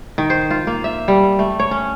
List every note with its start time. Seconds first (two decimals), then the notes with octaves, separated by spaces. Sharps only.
0.18 D#3
0.30 C5
0.51 F4
0.67 A#3
0.84 E5
1.08 G3
1.39 A3
1.60 C#5
1.71 C#4